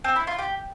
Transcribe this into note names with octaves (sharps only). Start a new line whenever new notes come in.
C4
E4
F4
G4